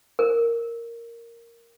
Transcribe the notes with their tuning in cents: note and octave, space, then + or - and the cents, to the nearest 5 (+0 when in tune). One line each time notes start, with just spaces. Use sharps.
A#4 -5